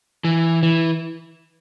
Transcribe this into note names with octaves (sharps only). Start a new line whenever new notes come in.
E3
E3